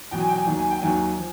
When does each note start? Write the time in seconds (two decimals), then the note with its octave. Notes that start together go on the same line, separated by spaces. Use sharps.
0.11 E2 B2 F#3 G5
0.20 G#5
0.29 G5
0.38 G#5
0.46 D#2 D#3 F#3
0.59 G#5
0.70 G5
0.81 D#2 D#3 F#3 G#5
1.17 F3